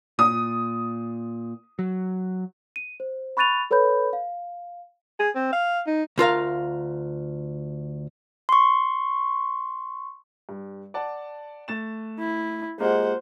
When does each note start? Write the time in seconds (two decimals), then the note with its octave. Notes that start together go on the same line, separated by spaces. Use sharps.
0.19 A#2 D#6
1.79 F#3
2.76 D#7
3.00 C5
3.37 B5 C#6 F#6 A6 D#7 F7
3.71 A4 B4 C#5 B5 G6
4.13 F5
5.19 G#4
5.35 C4
5.53 F5
5.87 D#4
6.18 D2 F4 A#4 F5
8.49 C6 C#6
10.49 G2
10.94 D5 F#5 A5
11.68 A3 A6 E7
12.19 E4
12.80 G#3 A#3 F4 G4 C5 F#5